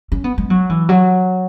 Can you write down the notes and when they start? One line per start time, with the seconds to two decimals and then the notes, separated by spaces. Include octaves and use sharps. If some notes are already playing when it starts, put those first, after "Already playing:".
0.12 C#4
0.24 B3
0.38 G#3
0.50 F#3
0.70 E3
0.89 F#3